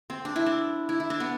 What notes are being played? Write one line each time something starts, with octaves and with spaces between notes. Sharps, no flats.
C4
D4
E4
D4
E4
E4
D4
B3